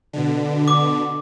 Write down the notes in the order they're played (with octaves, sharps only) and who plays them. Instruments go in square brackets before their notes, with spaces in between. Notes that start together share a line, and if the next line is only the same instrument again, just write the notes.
[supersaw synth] B2 D3
[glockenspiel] D6